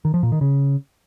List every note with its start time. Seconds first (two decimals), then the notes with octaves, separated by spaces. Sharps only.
0.05 D#3
0.14 F3
0.23 A#2
0.32 D#3
0.41 C#3